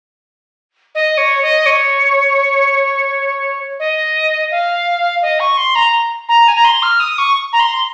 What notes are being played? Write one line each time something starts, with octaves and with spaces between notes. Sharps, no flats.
D#5
C#5
D#5
C#5
D#5
F5
D#5
C#6
C6
A#5
A#5
G#5
A#5
C6
F6
D#6
C#6
A#5
C6